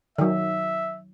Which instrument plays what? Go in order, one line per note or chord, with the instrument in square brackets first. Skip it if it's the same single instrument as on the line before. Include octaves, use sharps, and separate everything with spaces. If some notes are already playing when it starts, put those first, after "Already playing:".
[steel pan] D#3 F#3 [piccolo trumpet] E5